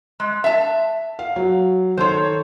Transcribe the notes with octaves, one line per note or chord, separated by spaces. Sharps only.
G#3
E5 A5
F5
F#3
D#3 A4 C5 C#5 C6